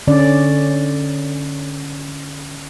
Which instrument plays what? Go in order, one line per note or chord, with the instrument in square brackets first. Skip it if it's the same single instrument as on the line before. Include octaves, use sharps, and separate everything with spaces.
[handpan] D3 C#4 D5